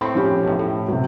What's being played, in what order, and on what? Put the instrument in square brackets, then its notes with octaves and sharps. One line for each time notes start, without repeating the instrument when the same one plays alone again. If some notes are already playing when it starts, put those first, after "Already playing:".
[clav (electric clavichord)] A2 C4 [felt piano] B5 C#6
[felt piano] F3 C#4 G4
[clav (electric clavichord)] B1 A2
A2
[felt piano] C3 F#3